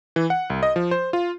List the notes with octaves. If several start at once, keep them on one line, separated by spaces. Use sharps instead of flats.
E3
F#5
C2
D#5
F3
C5
F4